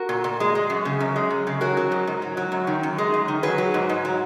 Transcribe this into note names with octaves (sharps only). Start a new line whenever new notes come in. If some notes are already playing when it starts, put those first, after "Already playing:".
Already playing: F#4 A#4
A#2
A#2
G#3
G#3
F#2
C#3
F#2
G#3
F#2
C#3
F#3 F#4 A#4
F#3
G#2
G#2
F#3
F#3
F#2
D#3
F#2
G#3
F#2
D#3
F#3 G#4 B4
F#3
G#2
G#2
F#3